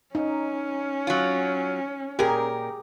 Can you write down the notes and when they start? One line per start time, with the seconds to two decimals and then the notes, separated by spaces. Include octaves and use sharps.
0.15 C#4 D#4
1.07 F#3 F4
2.19 A#2 G4 G#4 A#4